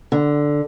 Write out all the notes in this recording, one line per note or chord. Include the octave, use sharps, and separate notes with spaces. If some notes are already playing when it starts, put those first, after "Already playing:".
D3